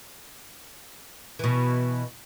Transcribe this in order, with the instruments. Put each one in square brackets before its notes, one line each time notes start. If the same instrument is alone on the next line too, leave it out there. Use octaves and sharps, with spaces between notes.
[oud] B2 E3